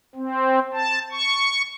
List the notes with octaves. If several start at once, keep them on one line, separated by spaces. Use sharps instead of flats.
C4
A5
C#6